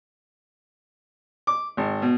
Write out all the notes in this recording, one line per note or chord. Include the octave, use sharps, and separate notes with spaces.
D6
G#1
B2